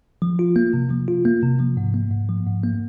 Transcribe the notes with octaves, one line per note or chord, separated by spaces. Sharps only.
F3
F4
A#3
C3
F3
F4
A#3
C3
F3
G#2
A#3
G#2
F3
G#2
A#3